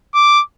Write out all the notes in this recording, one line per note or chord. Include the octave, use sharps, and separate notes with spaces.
D6